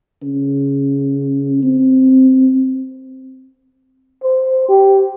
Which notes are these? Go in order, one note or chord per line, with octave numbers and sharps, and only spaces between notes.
C#3
C4
C5
G4